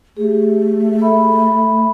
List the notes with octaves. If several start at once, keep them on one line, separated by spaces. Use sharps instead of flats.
A3 G4 G#4
A4 E5 B5